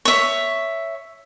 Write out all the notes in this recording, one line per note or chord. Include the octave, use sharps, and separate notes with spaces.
C#5 E5